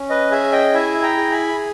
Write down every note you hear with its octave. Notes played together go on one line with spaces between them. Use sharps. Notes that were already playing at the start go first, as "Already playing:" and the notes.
Already playing: C#4
B4 D#5
G#4 E5 G#5
D#5 G5
E4 E5 G#5
G5 A#5
G#4
G#5 B5